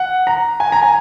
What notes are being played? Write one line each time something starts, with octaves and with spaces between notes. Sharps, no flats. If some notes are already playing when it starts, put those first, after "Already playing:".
Already playing: F#5
A#5
G#5
A#5
G#5